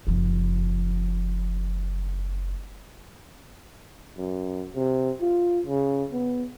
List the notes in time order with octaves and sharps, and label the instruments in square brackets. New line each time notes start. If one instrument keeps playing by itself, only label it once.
[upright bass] F#1 F3
[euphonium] F#2
C3
F4
C#3
B3